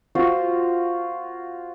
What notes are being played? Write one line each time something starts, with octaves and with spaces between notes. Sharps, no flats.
F4 F#4 C5 E6